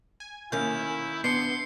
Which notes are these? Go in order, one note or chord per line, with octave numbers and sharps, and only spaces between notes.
G#5
D#3 A#3 C#4 E4 G6
B3 D4 C6 C7 C#7